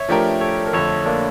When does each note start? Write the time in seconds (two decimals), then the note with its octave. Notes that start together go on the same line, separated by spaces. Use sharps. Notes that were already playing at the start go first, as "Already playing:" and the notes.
Already playing: C#5 E5
0.09 F3 A3 D4 G4 A#4
0.41 A4 C#5
0.67 A#4
0.73 F2 D3 A3 A4 C#5
1.06 A#3 D4